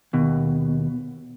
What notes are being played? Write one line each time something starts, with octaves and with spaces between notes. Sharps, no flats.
D#2 B2